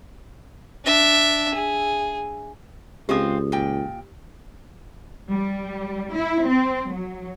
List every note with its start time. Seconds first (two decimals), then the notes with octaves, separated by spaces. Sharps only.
0.85 D4 E5
1.54 G#4
3.09 C#2 G#3 C4 F4 G4 D#6
3.52 A#2 G5
5.30 G3
6.15 E4
6.47 C4
6.90 F#3